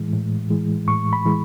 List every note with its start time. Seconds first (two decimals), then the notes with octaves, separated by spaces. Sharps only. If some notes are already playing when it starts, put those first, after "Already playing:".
Already playing: A2 E3 G#3
0.13 A2
0.50 E3 G#3
0.88 A2 C#6
1.13 B5
1.25 E3 G#3